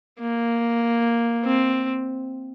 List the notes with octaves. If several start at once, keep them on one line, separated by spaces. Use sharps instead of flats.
A#3
C4